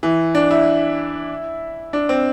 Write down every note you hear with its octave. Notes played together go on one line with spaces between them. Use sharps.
E3
D4
E4
D4
C4